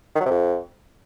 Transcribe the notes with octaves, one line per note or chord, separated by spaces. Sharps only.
D#3
F#3
C3
F2